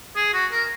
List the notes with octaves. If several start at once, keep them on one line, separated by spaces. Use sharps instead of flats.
G#4
F#4
A#4